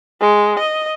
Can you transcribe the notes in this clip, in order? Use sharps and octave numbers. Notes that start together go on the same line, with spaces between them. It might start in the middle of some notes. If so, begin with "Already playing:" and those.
G#3
D#5